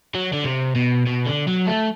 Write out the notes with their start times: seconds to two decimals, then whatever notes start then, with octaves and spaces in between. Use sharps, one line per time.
0.15 F#3
0.33 D3
0.44 C3
0.75 B2
1.06 B2
1.26 D3
1.47 F#3
1.67 A3